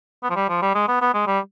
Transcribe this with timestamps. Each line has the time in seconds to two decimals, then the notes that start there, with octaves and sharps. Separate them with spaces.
0.23 B3
0.30 F3
0.36 G3
0.49 F3
0.62 G3
0.75 G#3
0.88 B3
1.01 B3
1.14 G#3
1.27 G3